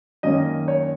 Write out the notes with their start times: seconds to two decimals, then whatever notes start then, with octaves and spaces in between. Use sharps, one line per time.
0.23 F#2 D#3 A#3 C#4 D#5
0.68 C#5